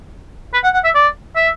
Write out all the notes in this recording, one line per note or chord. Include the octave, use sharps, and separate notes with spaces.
B4
F#5
F#5
E5
D5
E5